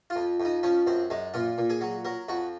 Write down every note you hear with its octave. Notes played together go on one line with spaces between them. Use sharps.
F4
F2
F2
D#4
F3 C#4
F#2 C4
F#2 G#3
A#2 F4
A#2
G#4
F#3
F#3 A#4
F2 F#4